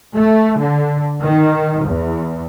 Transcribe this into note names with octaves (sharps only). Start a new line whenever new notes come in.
A3
D3
D#3
E2